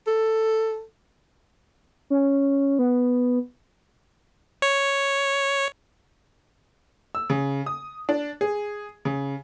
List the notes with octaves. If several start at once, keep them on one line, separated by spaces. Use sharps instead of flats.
A4
C#4
B3
C#5
E6
C#3
D#6
D4
G#4
C#3